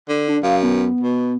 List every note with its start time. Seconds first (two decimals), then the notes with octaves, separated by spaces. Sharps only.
0.09 D3
0.28 D4
0.43 F#2 F5
0.63 B3
1.01 B2